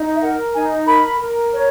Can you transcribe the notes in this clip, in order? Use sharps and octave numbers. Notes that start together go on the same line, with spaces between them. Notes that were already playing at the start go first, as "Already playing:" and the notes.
Already playing: D#4
E5
A#4 F#5
D#4 G#5
A#4 B5
A#4
C#5